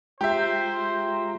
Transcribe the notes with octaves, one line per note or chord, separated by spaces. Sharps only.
G#3 F4 G4 C5 E5 A#5